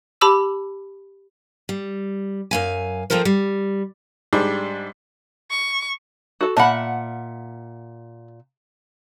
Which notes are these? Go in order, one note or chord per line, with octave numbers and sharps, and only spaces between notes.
G4 A5 B5 D6 E6 E7
G3
F#2 F5 G#5
F3 C4 F4 A4 A#4 C5
G3
G#2 G3 D4
C#6
F#4 A4
A#2 E5 F#5 A5 B5